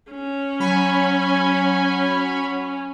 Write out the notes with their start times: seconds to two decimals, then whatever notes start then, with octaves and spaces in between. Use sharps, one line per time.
0.11 C#4
0.60 F#3 G#5 B5 C#6